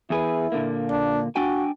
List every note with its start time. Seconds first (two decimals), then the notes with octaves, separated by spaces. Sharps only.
0.10 E2 E4 G#4 B4
0.52 A#2 D3 A#3
0.90 D4
1.36 D4 F#4 G5 G#5